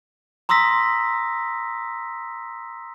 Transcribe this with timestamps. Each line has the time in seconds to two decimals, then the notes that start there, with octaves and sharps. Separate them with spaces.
0.49 A#5 C6 D#6 E6 A#6 B6